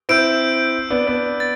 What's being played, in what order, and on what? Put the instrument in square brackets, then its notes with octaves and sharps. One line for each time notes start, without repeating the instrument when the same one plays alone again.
[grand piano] C4 E4 [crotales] E6 G6 D7
[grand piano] B3 D4
B3 D4
[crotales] A6